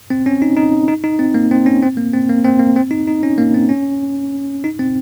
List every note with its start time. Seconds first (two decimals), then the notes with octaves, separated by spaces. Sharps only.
0.10 C4
0.26 C#4
0.42 D#4
0.57 D#4
0.88 D#4
1.04 D#4
1.19 C4
1.34 A#3
1.51 C4
1.66 C#4
1.83 C4
1.97 A#3
2.13 C4
2.29 A#3
2.44 C4
2.60 A#3
2.76 C4
2.91 D#4
3.08 D#4
3.23 C#4
3.38 A#3
3.54 C4
3.69 C#4
4.64 D#4
4.79 C4